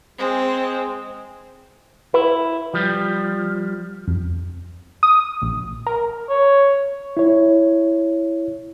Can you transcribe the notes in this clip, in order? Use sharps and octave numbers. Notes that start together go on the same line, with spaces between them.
G#3 C4 G#4
E4 B4
F3 G3
F2
D#6
A#1
A#4
C#5
E4 C#5